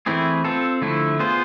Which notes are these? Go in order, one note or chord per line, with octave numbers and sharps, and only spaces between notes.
E3 A3 C4 E4 G#4
C4 F4 A4
D3 F3 A3 E4
B3 F4 G#4 C5